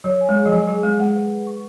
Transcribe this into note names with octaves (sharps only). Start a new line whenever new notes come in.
F#3 C#5
G#5
G#3
G#4
F3
F#3 G#5
F#3 G#4
G#3 G#4
G#3 F#5
B4
B4
C#6